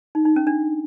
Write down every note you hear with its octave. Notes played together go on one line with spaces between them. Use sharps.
D#4
D#4
C#4
D4